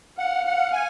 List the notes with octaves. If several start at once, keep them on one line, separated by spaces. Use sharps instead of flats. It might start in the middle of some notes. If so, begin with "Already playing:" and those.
F5 F#5
F#5
G#5